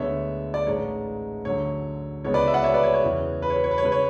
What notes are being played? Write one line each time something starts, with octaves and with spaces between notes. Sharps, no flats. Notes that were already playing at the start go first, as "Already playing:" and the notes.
Already playing: D2 D3 G#3 B3 C#5 E5
D5
A1 G#2 G#3 C#5
D2 D3 F#3 C#5
C#2 C#3 E3 G#3 B3 C#5
B4 D5
E5
D5 F#5
C#5 E5
B4 D5
C#5
C#5
E2 C#3 E3
B4
C#5
B4
C#5
B4
C#5
C#3 G#3 B4
C#5